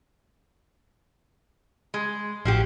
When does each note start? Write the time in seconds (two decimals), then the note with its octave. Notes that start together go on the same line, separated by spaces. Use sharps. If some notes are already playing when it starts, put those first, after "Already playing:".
1.94 G#3
2.45 A1 F3 F#4 G4